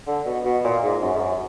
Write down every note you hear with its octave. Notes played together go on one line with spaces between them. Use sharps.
D3
B2
B2
A#2
G#2
F#2
G#2
F#2